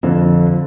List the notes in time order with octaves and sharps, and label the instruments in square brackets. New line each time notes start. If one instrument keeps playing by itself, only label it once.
[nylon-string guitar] F2 [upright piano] D3